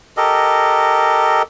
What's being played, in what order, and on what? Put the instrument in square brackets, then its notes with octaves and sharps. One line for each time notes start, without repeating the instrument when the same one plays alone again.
[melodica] G4 A4 A#4 D#5